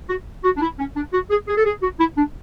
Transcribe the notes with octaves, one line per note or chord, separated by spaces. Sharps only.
F#4
F#4
D4
E4
C#4
D4
F#4
G#4
G#4
A4
G#4
F#4
E4
D4